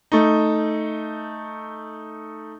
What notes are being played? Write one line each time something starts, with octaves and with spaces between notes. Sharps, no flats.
A3 D#4